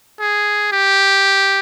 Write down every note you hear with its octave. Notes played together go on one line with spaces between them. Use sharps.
G#4
G4